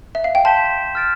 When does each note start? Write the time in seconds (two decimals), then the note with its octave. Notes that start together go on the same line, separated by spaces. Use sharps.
0.15 E5
0.24 F5
0.35 G5
0.45 A5 C6 G6 B6 E7 G7
0.95 F6 A6 D7